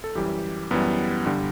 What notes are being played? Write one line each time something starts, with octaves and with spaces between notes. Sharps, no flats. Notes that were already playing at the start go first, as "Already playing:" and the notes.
A4
F#2 E3 G3 G4
F#2 E3 G3 B3
G2 D3 G3